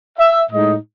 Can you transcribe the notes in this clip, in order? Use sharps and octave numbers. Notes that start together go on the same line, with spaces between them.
E5
A2 G#3 D#4 D#5